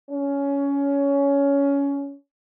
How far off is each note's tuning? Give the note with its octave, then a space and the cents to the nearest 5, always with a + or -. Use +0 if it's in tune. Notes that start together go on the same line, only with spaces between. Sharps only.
C#4 +15